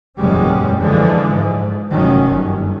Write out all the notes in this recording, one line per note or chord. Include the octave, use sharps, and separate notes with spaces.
F#1 E2 A#2 G3 G#3 C#4
D3 E3 F3 G#3
G#2
F1 F#2 D#3 C#4
G1